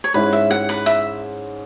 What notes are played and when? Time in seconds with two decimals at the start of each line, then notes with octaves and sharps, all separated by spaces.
0.04 C#5
0.14 G#2 G#3 C#4 E4 B4
0.33 E5
0.51 F#5
0.69 B4
0.86 E5